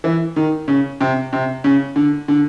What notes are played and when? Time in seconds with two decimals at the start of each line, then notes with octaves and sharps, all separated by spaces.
0.04 E3
0.36 D#3
0.68 C#3
1.01 C3
1.33 C3
1.64 C#3
1.96 D3
2.28 D3